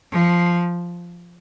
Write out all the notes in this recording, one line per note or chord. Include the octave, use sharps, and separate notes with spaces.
F3